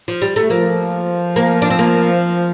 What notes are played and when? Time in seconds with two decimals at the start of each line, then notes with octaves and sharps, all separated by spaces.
0.08 F3
0.22 G3
0.36 A3
0.50 F3 A#3
1.36 A#3
1.62 D4
1.70 C4
1.79 A#3